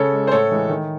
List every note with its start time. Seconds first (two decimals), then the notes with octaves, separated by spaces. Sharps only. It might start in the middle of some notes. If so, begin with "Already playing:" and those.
Already playing: C#3 A4 C#5
0.13 G#3
0.27 C5
0.31 A2 A4 C#5
0.51 E3 G#3
0.69 D#3